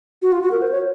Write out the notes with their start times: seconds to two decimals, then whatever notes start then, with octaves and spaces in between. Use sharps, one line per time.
0.22 F#4
0.32 F4
0.42 F#4
0.51 A#4
0.62 C5
0.72 C#5